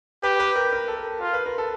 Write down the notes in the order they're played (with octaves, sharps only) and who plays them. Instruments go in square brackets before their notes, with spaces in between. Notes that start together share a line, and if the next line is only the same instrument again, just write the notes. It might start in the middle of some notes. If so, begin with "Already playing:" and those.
[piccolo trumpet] G4 [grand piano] B4
[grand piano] B4
A#4
A#4
A4
A#4
[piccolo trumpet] F4 [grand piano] A#4
[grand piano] B4
A#4
A4